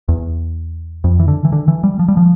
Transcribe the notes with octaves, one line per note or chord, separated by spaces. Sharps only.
E2
F2
E3
D3
E3
D3
E3
G3
F3
G3
F3